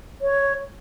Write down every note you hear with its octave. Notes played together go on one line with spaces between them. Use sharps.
C#5